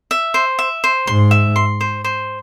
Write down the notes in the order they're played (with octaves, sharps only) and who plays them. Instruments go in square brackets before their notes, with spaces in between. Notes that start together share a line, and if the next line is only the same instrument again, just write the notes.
[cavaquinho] E5
C5
E5
C5
[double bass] G#2 [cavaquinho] C6
[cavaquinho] E5
C6
C5
C5